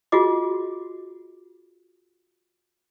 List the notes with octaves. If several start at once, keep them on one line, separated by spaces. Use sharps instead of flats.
F4 F#4 G#4 D#5 D6